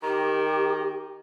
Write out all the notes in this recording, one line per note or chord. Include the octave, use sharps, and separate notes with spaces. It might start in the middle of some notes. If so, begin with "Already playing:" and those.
D#3 G4